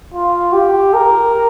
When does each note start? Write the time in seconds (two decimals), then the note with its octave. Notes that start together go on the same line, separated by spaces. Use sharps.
0.14 F4
0.53 G4
0.94 A#4